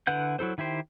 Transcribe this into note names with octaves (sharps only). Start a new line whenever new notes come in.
D3 E4 B4 F#5 G6
F#3 E4 A4 C5
D#3 E4 G4 C5